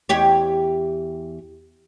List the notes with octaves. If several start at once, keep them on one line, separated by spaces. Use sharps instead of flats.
E2 G4 C#5